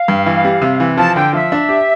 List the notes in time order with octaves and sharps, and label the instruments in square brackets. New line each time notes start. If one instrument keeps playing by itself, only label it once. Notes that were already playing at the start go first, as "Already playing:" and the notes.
Already playing: [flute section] F5
[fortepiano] G2
E3
G3
C3
E3
[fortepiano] F3 [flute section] A5
[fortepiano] D3 [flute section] G5
[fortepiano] F3 [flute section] E5
[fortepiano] D4
G4